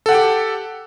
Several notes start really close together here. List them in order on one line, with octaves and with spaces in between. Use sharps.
A4 F#5 G5 G4